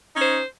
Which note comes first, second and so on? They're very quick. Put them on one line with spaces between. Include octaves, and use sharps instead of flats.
D#4 C#4 C5